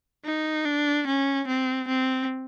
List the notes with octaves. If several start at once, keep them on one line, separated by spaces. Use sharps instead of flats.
D#4
D4
C#4
C4
C4